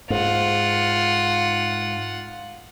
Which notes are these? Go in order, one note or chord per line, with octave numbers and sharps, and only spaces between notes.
G#2 F4 F#5